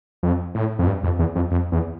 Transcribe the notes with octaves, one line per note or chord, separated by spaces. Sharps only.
F2
A2
F2
G2
F2
E2
F2
F2
E2